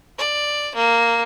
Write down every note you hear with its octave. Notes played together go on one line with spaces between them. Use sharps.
D5
A#3